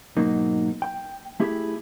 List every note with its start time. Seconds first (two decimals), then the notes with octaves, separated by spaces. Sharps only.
0.17 G#2 B2 F#3 A#3 D#4
0.82 G5
1.40 A3 E4 G4 G#4